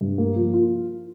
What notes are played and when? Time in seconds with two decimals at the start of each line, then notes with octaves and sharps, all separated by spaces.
0.01 G2
0.18 A#3
0.35 F3
0.53 F4